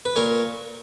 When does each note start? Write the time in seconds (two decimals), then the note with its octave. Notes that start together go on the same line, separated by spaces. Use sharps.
0.05 B4
0.16 A#2 A#4 C#5